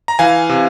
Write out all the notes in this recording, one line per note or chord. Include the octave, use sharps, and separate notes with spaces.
A#5
E3 F5 G#5
C3